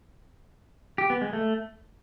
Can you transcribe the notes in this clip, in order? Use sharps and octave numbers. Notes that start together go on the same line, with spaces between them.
G4
B3
G#3
A3